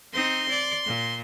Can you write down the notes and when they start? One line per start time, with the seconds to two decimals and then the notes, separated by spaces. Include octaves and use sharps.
0.13 C4 D#4 C6
0.49 D5
0.85 A#2